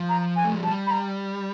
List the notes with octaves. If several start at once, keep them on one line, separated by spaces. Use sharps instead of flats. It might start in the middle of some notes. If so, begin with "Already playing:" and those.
Already playing: F3
A#5
G#5
A3
G#3
G3 A5
B5
A#5